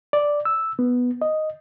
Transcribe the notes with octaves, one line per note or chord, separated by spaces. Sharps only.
D5
E6
B3
D#5